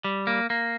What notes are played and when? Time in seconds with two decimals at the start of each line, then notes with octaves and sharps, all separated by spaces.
0.04 G3
0.27 A#3
0.50 A#3